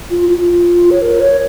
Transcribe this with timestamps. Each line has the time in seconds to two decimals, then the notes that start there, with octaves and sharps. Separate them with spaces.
0.11 F4
0.29 F4
0.91 C#5
1.02 A#4
1.20 C#5